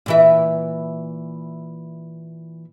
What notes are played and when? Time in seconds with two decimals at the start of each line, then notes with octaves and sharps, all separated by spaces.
0.06 A#2 E3 E5